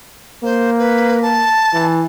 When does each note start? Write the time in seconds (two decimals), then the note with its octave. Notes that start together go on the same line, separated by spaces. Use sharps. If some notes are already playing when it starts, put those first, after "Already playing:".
0.44 A#3 C5
0.79 B4
1.22 A5
1.73 E3